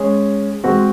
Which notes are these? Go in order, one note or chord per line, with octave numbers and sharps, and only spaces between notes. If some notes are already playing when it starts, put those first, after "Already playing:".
Already playing: G#3 C#4 G#4
G#3 C4 F#4